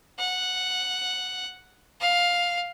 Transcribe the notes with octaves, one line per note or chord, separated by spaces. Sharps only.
F#5
F5